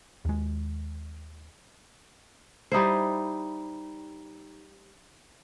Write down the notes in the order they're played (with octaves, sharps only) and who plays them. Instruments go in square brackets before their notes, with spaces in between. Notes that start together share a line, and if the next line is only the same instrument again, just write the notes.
[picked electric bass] D#2 G#3
[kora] G3 D#4 E4 C5